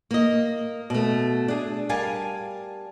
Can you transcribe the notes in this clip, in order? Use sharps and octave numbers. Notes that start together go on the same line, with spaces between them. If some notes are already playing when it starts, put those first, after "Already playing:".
A#3 D#5
B2 A3
D4 G#4
G3 A#4 F5 G#5 A5